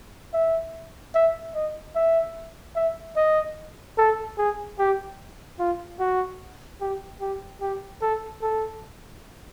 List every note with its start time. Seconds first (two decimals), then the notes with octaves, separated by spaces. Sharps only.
0.34 E5
1.15 E5
1.55 D#5
1.95 E5
2.76 E5
3.17 D#5
3.98 A4
4.38 G#4
4.79 G4
5.59 F4
6.00 F#4
6.81 G4
7.21 G4
7.61 G4
8.01 A4
8.42 A4